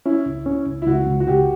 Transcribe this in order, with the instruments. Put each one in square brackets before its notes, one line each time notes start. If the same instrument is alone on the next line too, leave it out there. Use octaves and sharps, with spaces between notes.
[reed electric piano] C#4 [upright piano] E4
[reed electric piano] C#2
C#4
C#2
[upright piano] E4
[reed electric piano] C#2 [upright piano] F#4
[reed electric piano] C#2
[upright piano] F#4
[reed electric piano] C#2 [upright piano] G4